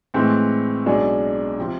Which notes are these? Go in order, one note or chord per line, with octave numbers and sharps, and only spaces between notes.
A2 E3 G#3 C4
B1 B2 G#3 D4 G#4
C3 F3